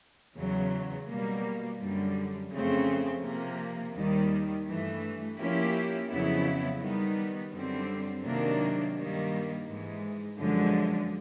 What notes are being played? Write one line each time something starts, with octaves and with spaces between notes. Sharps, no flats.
E2 C#3 F#3
B2 G3 A#3
F#2 D3 G3
F2 C#3 F3 A3 C4
C3 F3 A#3
D#2 D#3 G3
G2 E3 A3
F3 A#3 C#4 E4 G4
F2 C#3 F#3 B3 E4
D#3 G3 B3 D#4
F#2 D3 G3 C4
C3 D#3 F#3 A#3 D4
G2 D#3 G3 A#3
G#2 E3 G#3
F#2 D3 F3 G#3